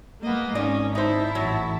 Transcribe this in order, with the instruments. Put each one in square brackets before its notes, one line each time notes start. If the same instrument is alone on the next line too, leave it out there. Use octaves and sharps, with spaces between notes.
[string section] G#3 A#3 [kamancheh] B3 D#5
[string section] G#1 [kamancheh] C#4 [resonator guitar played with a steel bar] D#4 D5
[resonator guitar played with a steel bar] D#4 C5 [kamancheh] E4 A5
[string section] A1 [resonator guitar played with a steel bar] F#3